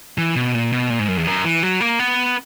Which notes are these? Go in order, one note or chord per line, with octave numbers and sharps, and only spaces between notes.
E3
B2
A#2
B2
A#2
G#2
F#2
E2
F#2
E3
F#3
A#3
B3